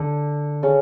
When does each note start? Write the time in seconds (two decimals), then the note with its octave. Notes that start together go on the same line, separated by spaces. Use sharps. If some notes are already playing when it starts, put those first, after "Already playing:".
Already playing: D3
0.63 C#3